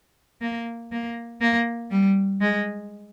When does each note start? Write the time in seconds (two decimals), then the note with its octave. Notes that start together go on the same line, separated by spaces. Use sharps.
0.41 A#3
0.92 A#3
1.41 A#3
1.91 G3
2.41 G#3